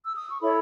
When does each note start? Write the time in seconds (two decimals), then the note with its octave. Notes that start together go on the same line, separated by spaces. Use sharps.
0.04 E6
0.16 D#6
0.28 C#6
0.40 E4 A4 C#5 B5